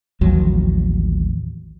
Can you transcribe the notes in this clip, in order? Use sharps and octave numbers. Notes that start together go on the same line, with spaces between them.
A1 D#2 F3 F#3